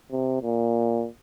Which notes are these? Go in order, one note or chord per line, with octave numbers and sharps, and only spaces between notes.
C3
A#2